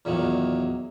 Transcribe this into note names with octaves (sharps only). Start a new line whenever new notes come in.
E2 A#2 D#3 F#3